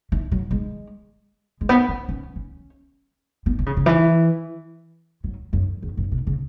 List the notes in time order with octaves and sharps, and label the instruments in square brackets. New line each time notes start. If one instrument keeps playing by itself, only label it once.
[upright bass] E3
F#3
G#3
G#3
B3
C#4
C#4
C#4
B3
E3
C#3
C#3
E3
F#3
F#2
E2
F#2
B2
C#3